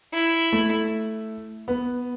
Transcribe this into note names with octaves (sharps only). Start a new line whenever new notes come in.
E4
A3
B3